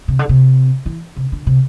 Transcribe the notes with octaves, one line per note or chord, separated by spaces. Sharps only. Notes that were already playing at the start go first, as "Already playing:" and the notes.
C3
D3
C3
E3
C3
D3
C3